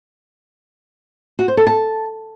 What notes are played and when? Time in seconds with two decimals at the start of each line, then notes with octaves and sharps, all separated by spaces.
1.39 F#4
1.48 C5
1.57 A4
1.67 A5